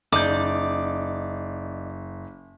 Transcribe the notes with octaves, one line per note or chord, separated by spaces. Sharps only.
F#1 D#4 D5 D6 G6